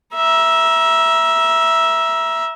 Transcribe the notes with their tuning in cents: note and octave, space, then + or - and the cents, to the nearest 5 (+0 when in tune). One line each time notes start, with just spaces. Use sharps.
E5 +0 A#5 +30